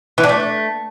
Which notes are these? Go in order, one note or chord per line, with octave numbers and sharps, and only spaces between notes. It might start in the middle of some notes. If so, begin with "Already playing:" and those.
E3
D4
A3